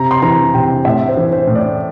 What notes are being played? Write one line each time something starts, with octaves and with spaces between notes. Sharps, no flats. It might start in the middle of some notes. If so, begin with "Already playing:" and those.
Already playing: C3 A#5
C6
E3 A#5
C3 G5
A2 E5
C5
E3
C5
A2
D5